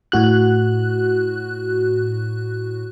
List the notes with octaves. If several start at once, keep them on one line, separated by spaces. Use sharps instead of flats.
A2 F#4 F#6